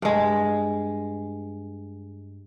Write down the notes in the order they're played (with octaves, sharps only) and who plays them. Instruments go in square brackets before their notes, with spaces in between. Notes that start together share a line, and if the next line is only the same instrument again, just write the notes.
[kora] G2 G#3